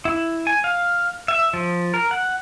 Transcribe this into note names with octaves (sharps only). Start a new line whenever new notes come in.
E4
G#5
F5
E5
F3
A#4
F#5